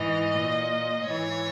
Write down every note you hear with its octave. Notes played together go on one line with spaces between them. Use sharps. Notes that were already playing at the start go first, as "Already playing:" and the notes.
Already playing: G#2 E3 D#5
A#2
G#2 E3 C#5